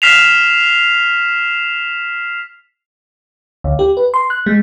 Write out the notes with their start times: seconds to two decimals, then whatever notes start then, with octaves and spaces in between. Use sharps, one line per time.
0.02 F6 B6 C7 E7 F7
3.64 D2
3.79 G4
3.97 B4
4.14 C6
4.30 F#6
4.46 G#3